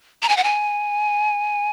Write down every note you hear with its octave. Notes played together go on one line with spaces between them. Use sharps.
A#5
G#5
F#5
G#5